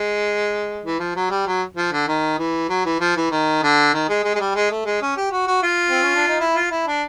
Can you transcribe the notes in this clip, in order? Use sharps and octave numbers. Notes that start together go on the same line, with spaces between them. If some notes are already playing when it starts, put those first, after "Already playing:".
Already playing: G#3
E3
F3
F#3
G3
F#3
F3
D3
D#3
E3
F#3
E3
F3
E3
D#3
D3
D#3
G#3
G#3
G#3
G3
G#3
A3
G#3
C#4
G4
F#4
F#4
F4
C4
C#4
D4
D#4
E4
F4
E4
D4